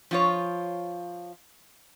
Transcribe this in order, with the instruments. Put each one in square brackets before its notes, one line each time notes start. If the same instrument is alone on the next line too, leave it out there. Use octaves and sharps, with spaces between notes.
[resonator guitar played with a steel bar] F3 F4 C#5